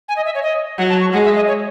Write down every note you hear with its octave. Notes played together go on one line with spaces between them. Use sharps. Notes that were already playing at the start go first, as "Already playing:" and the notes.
G#5
D#5
E5
C#5
D#5
F#3 F#5
A5
C#6
G#3 F#5
E5
D#5
C#5